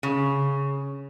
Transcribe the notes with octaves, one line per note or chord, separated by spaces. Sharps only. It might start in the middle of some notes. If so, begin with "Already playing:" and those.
C#3